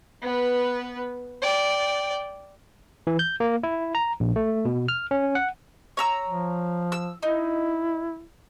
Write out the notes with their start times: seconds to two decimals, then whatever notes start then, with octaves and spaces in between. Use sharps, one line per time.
0.23 B3 B4
1.42 D5 G5
3.07 E3
3.19 G6
3.40 A#3
3.63 E4
3.95 A#5
4.20 A#1
4.36 A3
4.65 B2
4.88 F6
5.11 C#4
5.35 F#5
5.97 C#5 A#5 E6
6.28 F3
6.92 E6
7.23 D#4 E4